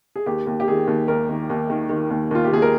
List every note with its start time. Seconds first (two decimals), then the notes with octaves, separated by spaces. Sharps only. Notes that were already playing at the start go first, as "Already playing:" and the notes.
0.16 G#4
0.26 D#2 G4
0.47 D#2
0.60 G4
0.68 D#3 G#4
0.87 D#2
1.08 D#2 A#4
1.29 D#3
1.50 D#2
1.70 D#3
1.89 D#3
2.10 D#2
2.31 D#2 F4
2.44 G4
2.52 D#2 G#4
2.62 A#4